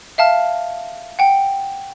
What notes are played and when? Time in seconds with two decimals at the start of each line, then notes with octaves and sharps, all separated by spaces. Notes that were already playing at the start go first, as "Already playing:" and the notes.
0.18 E5 F5 A5 F6
1.19 F#5 G5